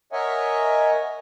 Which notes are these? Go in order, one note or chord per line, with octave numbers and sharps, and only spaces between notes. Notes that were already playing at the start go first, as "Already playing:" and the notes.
A#4 C#5 D#5 E5 F#5 G#5